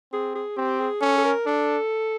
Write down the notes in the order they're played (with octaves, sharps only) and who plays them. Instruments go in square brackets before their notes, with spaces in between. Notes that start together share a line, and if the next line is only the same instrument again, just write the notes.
[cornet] C4 [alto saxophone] G#4
[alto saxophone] G#4
[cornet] C4 [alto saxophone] G4
[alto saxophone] G#4
[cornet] C#4 [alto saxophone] A4
[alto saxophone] A4
A#4
[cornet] D4 [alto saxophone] A4